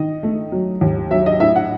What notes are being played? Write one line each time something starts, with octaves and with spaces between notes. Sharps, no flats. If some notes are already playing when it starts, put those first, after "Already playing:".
Already playing: D#3 D#5
A3
F#3
D#2
F#3 E5
D#5
A2 E5
F#5